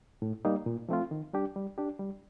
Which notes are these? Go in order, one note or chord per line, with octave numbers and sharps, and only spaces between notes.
A2
G3 A#3 D#4
A#2
F3 A3 C4 F4
D#3
G3 D4 G4
G3
D4 G4
G3